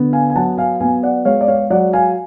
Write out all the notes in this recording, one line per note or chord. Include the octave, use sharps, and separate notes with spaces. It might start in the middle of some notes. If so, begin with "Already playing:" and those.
Already playing: D3 B3
F5 G#5
G#5
F#3 F#5 A5
F5 G#5
B3 F5 G#5
D5 F#5
G#3 C#5 F5
D5
C#5 F5
F#3 D5 F#5
F5 G#5